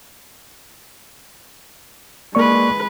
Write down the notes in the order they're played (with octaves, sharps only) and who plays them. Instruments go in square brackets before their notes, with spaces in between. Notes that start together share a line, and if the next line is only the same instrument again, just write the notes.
[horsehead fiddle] G#3 B4 [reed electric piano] A#3 D5 C#6